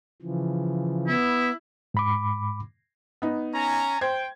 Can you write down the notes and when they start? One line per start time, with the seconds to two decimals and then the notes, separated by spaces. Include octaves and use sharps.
0.22 C#3 E3 F3
1.07 B3 E4
1.94 G#2 B5 D6
3.22 B3 D#4
3.55 C#4 G#5 A#5
4.01 C5 G5 G#6